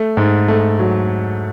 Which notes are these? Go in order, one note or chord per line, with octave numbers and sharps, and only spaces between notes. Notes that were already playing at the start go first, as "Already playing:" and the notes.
Already playing: A3
G#2
A3
F#3